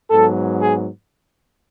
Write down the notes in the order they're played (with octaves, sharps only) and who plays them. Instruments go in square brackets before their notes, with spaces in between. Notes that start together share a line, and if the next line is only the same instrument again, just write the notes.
[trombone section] G#2 F#3 B3 A4
G#4